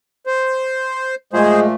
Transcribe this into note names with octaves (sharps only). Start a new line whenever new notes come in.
C5
A#2 F3 G#3 A3 G#4 C5